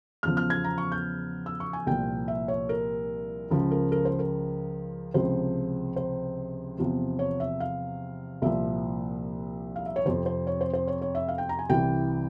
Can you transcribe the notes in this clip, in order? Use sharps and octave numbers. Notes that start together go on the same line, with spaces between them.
E2 C#3 F3 F6
F6
G#6
A#5
C#6
G6
E6
C#6
G#5
C2 A#2 F3 G5
E5
C#5
A#4
C#2 C#3 F3
A#4
A#4
C5
A#4
C#2 C3 F3 C5
C5
E2 C3 F3
C#5
E5
F5
C2 A#2 F3 E5
F5
E5
C#5
F2 C3 F3 C5
C5
C#5
C5
C5
C#5
C#5
E5
F5
G5
A#5
G#5
C2 C3 E3 G5